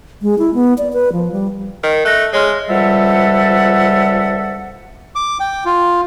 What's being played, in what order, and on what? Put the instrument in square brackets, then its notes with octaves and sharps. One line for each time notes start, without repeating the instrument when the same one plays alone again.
[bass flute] G#3
E4
B3
D5
B4
F3
G3
[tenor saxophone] D#3
[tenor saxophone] A3 [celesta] F#6 A#6
[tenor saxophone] G#3 [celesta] C#5 C6 F6
[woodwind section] C#2 F3 G3 A4 E5 F#5
[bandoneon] D6
G5
F4